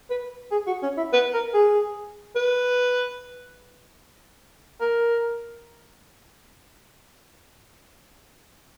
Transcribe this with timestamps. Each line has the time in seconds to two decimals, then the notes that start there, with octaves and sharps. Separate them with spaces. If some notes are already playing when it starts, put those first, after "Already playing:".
0.11 B4
0.51 G#4
0.67 F#4
0.83 C#4
0.97 E4
1.13 B4
1.34 A#4
1.54 G#4
2.36 B4
4.81 A#4